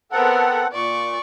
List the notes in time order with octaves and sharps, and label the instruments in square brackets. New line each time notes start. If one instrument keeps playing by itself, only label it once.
[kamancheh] B3 A#4 [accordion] C4 A4 F#5
[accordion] A#2 [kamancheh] D5 C#6